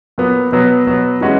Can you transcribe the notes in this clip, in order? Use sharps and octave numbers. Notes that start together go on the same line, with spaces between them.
A#2 F#3 B3
B2 F#3 B3
B2 F#3 B3
E3 G#3 C#4 F#4